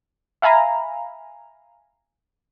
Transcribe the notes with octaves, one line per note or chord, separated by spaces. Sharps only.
E5 F5 G#5 A#5 B5